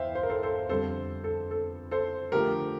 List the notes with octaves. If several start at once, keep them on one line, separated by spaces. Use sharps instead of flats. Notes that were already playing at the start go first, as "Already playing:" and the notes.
Already playing: E2 E3 C5 E5 F5 G5
C5
A#4
A4 C5
A4 C5
F2 D3 G3 C4 A4 C5
A4
A4
A4 C5
D3 F3 A3 G4 A#4